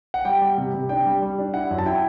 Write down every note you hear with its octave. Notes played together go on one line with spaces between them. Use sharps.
F#5
G3 G5
G3
C3
C3
D4 G5
G3
G3
D4
E4 F#5
F#2
A5
E4 G5